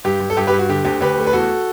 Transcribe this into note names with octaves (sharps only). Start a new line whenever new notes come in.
G2 G4
G2
A4
G2 G4
G4 B4
G2
F#4
D3 G4
D2 G4
D2 G4 B4
A3
B4
E2 F#4 A4